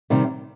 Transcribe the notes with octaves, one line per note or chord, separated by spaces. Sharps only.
C3 D#3 G3